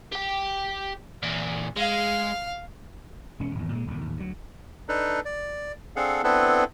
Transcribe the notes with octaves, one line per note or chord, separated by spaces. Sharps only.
G4 G5
A#2 E3
G#3 F5
E1 G#3 C#4
G#1 E2
A#2 G#3
D#1 C2 F#2 D3
A1 D#2
D2 F#3
D4 D#4 A4 B4
D5
C4 D4 G#4 A4 F5 F#5
B3 C4 D4 E4 A4 B4